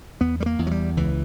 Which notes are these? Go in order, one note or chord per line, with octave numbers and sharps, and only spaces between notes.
E2 B3
G3
A#3
E2
F#3
G3
C#2 E3